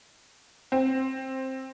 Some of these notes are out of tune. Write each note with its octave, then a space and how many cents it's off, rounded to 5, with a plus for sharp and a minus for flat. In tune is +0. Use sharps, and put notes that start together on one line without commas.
C4 +10